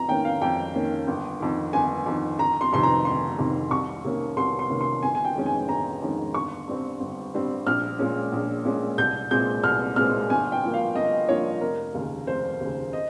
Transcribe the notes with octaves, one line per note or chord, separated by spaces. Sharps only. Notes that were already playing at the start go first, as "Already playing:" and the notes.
Already playing: F2 A#5
D#3 A#3 C#4 G5
F5
F2 G5
D#3 A#3 C#4
G1
F2 D#3
G1 G#5
F2 D#3
G1 A#5
C6
F2 C3 D#3 C6
A#5
G1 C6
F2 C3 D#3
C2 C#6
C3 D#3 A#3 C#4
C2 C6
C6
C3 D#3 A#3 C#4
C6
G1 G#5
G#5
G5
F2 D#3 G#3 C#4
G#5
G1 A#5
F2 D#3 G#3 C#4
G1 C#6
G2 G3 C4
G1
G2 G3 C4
A#1 F6
A#2 G#3 C#4
A#1
A#2 G#3 C#4
C2 G6
A#2 G#3 C4 G6
C2 F6
A#2 G#3 C4 F6
G1 G#5
G5
G2 F3 A#3
F5
G1 D#5
G2 F3 A#3 C#5
F1 A#4
D#2 C#3
F1 C5
D#2 C#3
D#5